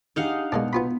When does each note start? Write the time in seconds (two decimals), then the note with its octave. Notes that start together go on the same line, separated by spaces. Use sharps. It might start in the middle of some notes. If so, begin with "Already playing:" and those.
0.16 D4 D#4 G4 G#4 F5 F#5
0.52 B2 G#3 A#3 D4
0.73 B3 F4 B5